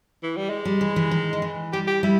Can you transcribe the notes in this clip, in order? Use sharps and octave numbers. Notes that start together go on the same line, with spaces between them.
E3
G3
G#3
G3
E3
E3
D#3
D#3
E3
G3 G4
G4
G3 E4